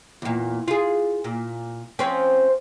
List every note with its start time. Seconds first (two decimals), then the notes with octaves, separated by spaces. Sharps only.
0.22 E2 A#2
0.68 F4 G#4
1.24 A#2
1.99 F3 C4 C#4